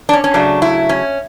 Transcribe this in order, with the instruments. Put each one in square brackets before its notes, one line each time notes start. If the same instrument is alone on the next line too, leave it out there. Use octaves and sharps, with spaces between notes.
[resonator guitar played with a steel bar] D4
C#4
C#4
C#3 F#3 A3 D4
E4
C#4